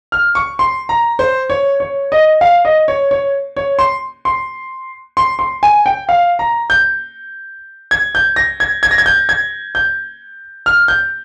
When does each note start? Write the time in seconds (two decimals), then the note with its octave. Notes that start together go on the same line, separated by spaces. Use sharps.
0.12 F6
0.35 C#6
0.59 C6
0.89 A#5
1.19 C5
1.50 C#5
1.80 C#5
2.12 D#5
2.41 F5
2.65 D#5
2.88 C#5
3.11 C#5
3.57 C#5
3.79 C6
4.25 C6
5.17 C6
5.39 C6
5.63 G#5
5.86 G5
6.09 F5
6.39 A#5
6.70 G6
7.91 G#6
8.15 G6
8.36 A#6
8.60 G#6
8.83 G#6
8.91 A#6
8.98 G#6
9.06 G6
9.29 G#6
9.75 G6
10.66 F6
10.88 G6